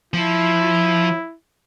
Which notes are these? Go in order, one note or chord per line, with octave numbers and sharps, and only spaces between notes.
F3 E4